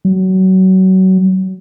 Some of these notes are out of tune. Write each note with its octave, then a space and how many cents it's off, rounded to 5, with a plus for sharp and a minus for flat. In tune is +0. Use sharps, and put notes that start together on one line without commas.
F#3 +25